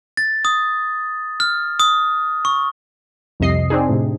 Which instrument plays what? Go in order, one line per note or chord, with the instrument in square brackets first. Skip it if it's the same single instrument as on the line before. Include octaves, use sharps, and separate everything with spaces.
[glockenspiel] A6
D#6
F6
D#6
C#6
[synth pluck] C2 F2 C3 D#5 C7
C4 D4 D#4 G#4
A2 C3